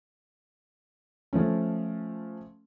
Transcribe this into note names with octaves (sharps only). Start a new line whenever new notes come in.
F3 A3 C#4